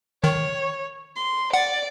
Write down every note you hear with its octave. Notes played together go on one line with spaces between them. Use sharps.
D#3 C#5
C6
D5 F#5